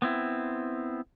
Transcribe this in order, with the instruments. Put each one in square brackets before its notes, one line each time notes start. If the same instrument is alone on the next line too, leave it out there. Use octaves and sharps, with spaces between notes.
[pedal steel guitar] B3 C4 E4